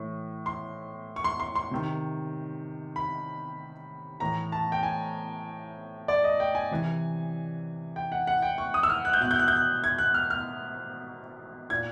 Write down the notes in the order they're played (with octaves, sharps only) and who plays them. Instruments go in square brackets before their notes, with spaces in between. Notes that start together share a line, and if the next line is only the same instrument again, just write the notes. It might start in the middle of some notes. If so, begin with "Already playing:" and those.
Already playing: [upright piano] A2 E3
C6
C#6
C6
C6
C6
C3 D#3
B5
A2 E3 A#5
A5
G5
G#5
D5
D#5
G5
G#5
C3 E3
G5
F#5
F#5
G5
C#6
D#6
E6
F6
F#6
G6
B2 F#6
G6
F#6
G6
F#6
G#6
F#6
F6
F6
A#2 G#6